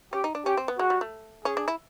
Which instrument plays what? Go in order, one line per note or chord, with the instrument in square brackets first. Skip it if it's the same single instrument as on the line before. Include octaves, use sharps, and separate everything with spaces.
[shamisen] C#4 [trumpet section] G4
[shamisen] D#4
D4
[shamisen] C#4 [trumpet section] G4
[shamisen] C4
B3
[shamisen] G#3 [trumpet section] F#4
[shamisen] G3
A3
[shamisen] C#4 [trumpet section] G#4
[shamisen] D4
E4